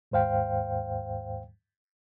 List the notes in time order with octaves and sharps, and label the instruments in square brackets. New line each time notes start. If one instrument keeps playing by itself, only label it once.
[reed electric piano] D#2 G#2 C5 F5 G5